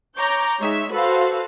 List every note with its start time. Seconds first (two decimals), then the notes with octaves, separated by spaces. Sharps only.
0.16 C#5 A#5 D6 G6
0.59 G#3 D#4 C#5 E5
0.91 F#4 A4 B4 C5 F5